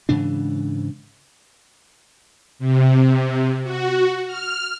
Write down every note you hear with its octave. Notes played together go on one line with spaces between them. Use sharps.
G#2 C#3 E3 D4
C3
F#4
F6